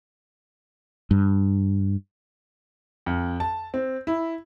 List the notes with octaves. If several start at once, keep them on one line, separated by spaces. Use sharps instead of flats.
G2
F2
A5
C4
E4